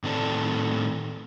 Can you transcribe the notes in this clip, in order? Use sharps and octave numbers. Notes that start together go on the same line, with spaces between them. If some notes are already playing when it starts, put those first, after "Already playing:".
A2 D#3 C4 A4 D5